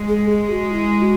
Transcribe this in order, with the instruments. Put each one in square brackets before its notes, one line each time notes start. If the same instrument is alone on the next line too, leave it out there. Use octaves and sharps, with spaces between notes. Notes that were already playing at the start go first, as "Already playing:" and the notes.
Already playing: [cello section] G#3
[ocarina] G#4
G#4
F#4
E4
F#4